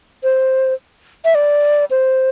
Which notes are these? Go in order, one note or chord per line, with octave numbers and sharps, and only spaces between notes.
C5
E5
D5
C5